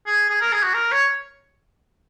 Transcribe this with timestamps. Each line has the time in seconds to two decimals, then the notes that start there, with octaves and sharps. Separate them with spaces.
0.06 G#4
0.30 G#4
0.41 A#4
0.52 G#4
0.63 F#4
0.74 A#4
0.92 C#5